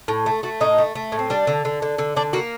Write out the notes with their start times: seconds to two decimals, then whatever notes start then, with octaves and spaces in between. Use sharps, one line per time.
0.08 A2
0.26 A3
0.43 A3 F#4
0.61 A2 D#4
0.78 A3
0.95 A3
1.12 A2
1.19 C4
1.30 G3 D4
1.47 D3
1.65 D3
1.82 D3
1.98 D3
2.16 D3 D4
2.33 A#3 F#4